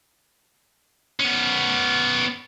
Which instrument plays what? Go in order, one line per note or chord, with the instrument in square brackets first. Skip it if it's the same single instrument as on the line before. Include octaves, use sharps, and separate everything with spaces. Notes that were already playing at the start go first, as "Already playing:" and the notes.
[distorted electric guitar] B3 C#4